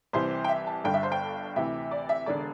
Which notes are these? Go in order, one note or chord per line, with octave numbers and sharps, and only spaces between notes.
C2 C3 E3 C5
G5
E5
A5
G1 G2 D3 G5
E5
C5
G5
D2 C3 E3 E5
D5
E5
E1 D3 D5